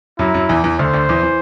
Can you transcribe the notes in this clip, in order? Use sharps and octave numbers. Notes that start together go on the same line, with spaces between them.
F#2 F#3 E4
F#2 F#3
E2 E3
E2 E3
D2 D3 C5
D2 D3
E2 E3
E3